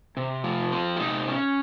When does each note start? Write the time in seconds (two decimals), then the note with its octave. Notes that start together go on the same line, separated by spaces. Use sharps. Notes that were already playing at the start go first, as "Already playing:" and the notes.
0.17 C3
0.44 F3
0.72 C4
0.97 F4
1.00 C3 D#4
1.29 C#4